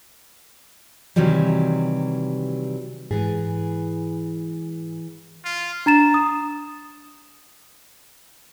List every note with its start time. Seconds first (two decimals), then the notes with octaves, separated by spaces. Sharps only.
1.16 C3 D#3 E3 F#3 G3
3.11 G#2 E3 G#4
5.45 F4
5.86 D4 A#5 A6 E7
6.14 D#6